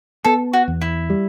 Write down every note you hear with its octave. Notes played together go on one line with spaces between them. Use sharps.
B3 A4
F#4
E2
E4
G3